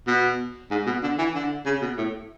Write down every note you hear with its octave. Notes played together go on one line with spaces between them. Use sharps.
B2
G#2
B2
D3
E3
D3
C#3
B2
A2